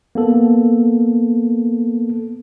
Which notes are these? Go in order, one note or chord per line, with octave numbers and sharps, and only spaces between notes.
A#3 B3 A4